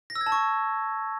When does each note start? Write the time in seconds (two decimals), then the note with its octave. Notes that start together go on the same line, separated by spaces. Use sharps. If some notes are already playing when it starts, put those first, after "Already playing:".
0.10 A#6
0.15 E6
0.21 G#6
0.26 A5
0.32 C#6